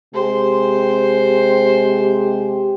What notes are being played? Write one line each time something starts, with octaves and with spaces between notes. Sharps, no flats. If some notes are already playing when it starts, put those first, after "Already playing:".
C3 G#3 G4 C5